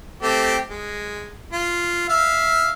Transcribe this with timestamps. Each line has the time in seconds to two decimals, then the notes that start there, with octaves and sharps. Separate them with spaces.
0.22 A3 C4 G4
0.70 G#3
1.53 F4
2.09 E5 F5